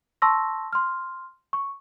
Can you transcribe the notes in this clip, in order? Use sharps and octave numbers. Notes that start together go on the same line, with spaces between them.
A5 C6 C#6 E6 A#6
C6 F6
C#6